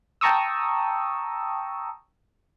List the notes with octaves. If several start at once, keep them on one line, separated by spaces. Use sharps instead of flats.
G5 A5 A#5 C#6 D#6 E6